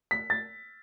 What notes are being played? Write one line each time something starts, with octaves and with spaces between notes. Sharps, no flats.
B6
A6